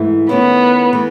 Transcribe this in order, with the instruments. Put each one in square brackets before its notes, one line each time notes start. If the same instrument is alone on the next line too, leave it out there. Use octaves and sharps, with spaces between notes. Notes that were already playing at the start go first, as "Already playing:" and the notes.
Already playing: [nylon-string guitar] G#2 E3 A3 E4
[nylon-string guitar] D#3 A3 C#4 E4 [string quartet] B3
[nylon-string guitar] E3 A3